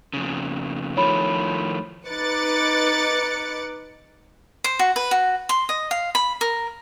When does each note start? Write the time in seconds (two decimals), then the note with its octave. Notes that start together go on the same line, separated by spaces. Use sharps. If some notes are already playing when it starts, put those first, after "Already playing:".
0.13 F2 C#3
0.97 D#3 F3 A3 C#5 B5
2.07 D#4 B4 D6 F#6 A6 C#7
4.64 C5
4.79 F#4
4.96 B4
5.11 F#4
5.49 C6
5.69 D#5
5.91 F5
6.15 B5
6.41 A#4